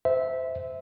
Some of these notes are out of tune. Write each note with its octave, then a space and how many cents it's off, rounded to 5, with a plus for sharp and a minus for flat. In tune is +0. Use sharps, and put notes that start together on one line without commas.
C5 -20 E5 -15